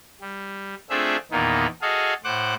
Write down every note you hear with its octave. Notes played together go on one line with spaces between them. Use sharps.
G3
A3 C4 D4 F4 G#4 E5
E2 A#2 D#3 A#3 B3 D#4
F#4 G#4 A4 D#5 F5
A2 C5 F#5 D6 F#6